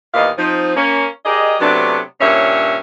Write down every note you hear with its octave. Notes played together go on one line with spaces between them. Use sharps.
D#2 A#2 E3 B3 D#5 F5
F3 C4 D#4
A#3 C#4
G4 G#4 A#4 D5 D#5
C3 F#3 A3 B3 D4
G2 A#2 D#3 C#4 C#5 E5